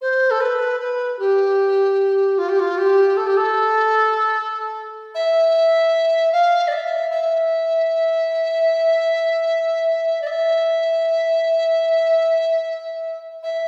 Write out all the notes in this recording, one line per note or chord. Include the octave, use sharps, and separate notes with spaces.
C5
A4
B4
B4
G4
F4
G4
F4
G4
A4
G4
A4
E5
F5
D5
E5
E5
D5
E5
E5